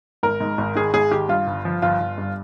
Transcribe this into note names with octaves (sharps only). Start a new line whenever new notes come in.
G#1 A#4
G#2
G#1
D#3 G#4
G#1 G#4
D#3 G4
G2 F4
G1
F3
G1 F4
G1
G2